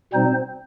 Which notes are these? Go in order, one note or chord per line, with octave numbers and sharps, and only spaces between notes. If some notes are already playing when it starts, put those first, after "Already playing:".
B2 G3 C4 D#4 C5